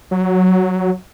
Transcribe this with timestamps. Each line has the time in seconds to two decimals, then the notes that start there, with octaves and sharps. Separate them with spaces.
0.11 F#3